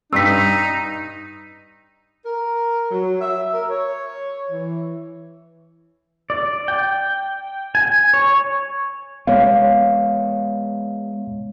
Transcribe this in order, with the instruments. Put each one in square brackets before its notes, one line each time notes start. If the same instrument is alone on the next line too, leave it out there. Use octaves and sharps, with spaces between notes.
[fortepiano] G2 [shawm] D#4 [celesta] E6 B6
[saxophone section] A#4
F#3
E5
A#4
C#5
E3
[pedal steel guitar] D5
G5
G#5
C#5
[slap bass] G#3 B3 [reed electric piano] C#5 F5